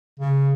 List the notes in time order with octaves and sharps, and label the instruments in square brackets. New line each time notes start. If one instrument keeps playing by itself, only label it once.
[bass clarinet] C#3